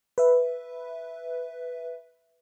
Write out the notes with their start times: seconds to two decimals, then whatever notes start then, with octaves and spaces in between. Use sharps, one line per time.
0.18 B4 E5